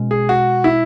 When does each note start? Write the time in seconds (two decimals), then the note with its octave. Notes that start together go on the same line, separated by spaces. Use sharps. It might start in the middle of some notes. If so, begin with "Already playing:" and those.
Already playing: B2 G#3 C#4
0.11 G#4
0.29 F#4
0.64 E4